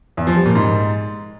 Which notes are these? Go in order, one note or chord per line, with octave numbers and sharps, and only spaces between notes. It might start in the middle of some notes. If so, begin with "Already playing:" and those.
E2
F3
G3
A#2
G#2